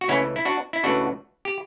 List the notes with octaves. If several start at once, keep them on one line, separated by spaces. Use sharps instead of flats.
F#4
C#2 C#3 E3 A3 C#4 E4
E4
D4 F#4
E4
C#2 C#3 E3 A3 D4 F#4
G4